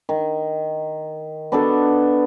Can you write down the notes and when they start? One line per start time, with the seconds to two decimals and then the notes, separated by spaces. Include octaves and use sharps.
0.09 D#3
1.52 B3 D4 F#4 A4